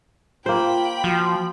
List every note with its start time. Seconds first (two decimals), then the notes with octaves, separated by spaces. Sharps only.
0.46 A#3 F4 C5 G5 B5
1.04 F3 F#4